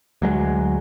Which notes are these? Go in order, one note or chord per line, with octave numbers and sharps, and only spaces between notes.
D2 F#3 G#3